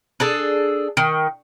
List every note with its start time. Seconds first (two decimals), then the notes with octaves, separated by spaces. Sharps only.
0.20 D4 G#4 A4
0.97 D#3